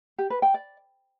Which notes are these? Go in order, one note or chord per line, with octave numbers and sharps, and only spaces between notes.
G4
B4
G5
D5